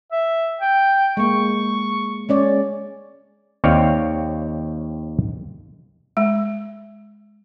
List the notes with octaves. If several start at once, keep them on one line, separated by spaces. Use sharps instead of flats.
E5
G5
G#3 A#3 C#6
G#3 C#4 C#5 D5
D#2 C4 C#5 D5 F5 G5
G#3